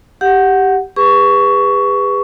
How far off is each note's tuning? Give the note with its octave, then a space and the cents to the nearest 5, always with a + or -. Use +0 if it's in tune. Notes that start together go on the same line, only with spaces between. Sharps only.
G4 +0 F#5 +0
G#4 -40 B4 +0 C#6 +15